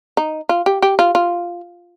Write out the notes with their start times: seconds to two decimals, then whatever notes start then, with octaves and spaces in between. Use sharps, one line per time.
0.17 D#4
0.49 F4
0.66 G4
0.82 G4
0.99 F4
1.15 F4